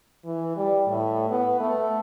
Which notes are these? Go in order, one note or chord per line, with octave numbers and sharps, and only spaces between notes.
E3
G3
A2
B3
A3